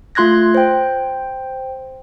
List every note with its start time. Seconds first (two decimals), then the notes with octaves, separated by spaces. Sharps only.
0.15 A3 F4 C6 F#6 G#6 A#6
0.55 C5 G5